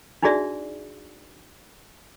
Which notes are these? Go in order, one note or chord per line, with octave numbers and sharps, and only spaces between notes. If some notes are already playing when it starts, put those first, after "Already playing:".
D4 D#4 F#4 G#4 D5 E5